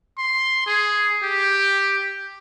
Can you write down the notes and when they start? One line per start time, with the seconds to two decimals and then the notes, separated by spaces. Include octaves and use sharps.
0.18 C6
0.67 G#4
1.23 G4